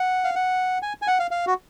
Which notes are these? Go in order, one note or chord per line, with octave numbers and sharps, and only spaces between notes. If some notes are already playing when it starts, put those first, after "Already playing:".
Already playing: F#5
F5
F#5
G#5
G#5
F#5
F5
F5
F#4